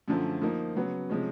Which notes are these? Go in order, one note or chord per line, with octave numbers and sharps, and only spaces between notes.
F#2 D3 F3 A3
F3 A#3 D#4
C#3 F#3 B3
C3 F3 G#3 C#4